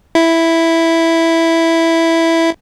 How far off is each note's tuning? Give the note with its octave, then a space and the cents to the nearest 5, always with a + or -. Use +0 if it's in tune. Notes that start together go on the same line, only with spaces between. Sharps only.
E4 +0